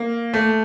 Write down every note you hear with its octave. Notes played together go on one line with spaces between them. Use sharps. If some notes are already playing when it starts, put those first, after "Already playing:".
Already playing: A#3
A3